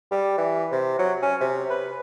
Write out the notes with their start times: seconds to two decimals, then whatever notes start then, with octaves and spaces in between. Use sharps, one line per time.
0.11 G3
0.38 E3
0.72 C3
0.99 F#3
1.22 C#4
1.41 C3
1.70 B4